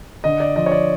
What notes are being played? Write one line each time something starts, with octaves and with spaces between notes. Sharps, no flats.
D3 D#5
D5
F3 D#5
C#5
D5